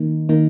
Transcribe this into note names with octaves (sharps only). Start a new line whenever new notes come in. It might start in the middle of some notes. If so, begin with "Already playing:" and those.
Already playing: D#3 A#3 D#4
D#3 A#3 D#4